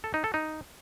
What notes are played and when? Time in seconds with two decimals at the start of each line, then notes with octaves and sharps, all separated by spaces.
0.04 A4
0.14 D#4
0.24 A4
0.34 D#4